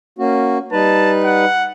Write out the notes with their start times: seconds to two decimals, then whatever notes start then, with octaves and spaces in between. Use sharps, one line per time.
0.19 A#3 C#4 F#4
0.72 G3 D#4 B4 A5
1.24 F#5